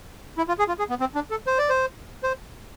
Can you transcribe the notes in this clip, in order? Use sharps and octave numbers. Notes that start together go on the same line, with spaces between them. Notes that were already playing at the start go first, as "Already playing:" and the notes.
E4
F4
G#4
F4
G#4
B3
C4
D4
A4
C5
D5
C5
C5